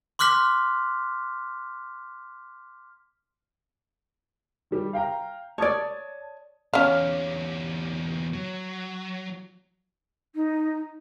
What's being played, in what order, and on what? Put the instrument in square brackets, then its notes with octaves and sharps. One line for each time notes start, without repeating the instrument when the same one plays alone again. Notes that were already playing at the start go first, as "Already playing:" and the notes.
[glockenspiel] C6 D6 F6 F#6 B6
[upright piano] D#3 G3 G4
F5 G5 A#5
[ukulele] C#5 D5 [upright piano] A5 D#6 G#6
[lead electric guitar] E2 G4 [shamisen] C#4 F5
[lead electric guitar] F#3
[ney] D#4